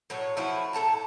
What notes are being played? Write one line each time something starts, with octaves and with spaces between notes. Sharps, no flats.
A2 F#3 C#5
F3 A3 E4 F#4
A2 A4 A5 A#5